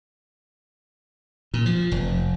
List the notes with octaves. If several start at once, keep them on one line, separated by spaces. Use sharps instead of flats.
A#2
F3
F1